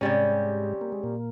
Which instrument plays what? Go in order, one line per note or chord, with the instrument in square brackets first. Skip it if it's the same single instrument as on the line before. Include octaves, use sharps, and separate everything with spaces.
[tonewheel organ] G#2 G#3 [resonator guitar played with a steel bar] C3 G3 C#4
[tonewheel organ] A#3
G#3
A#2 A#3